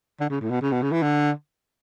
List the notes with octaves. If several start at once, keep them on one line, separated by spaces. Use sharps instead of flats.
D3
C#3
A2
B2
C#3
B2
C#3
E3
D3